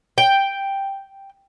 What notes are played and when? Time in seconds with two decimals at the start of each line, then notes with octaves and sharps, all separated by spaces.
0.18 G5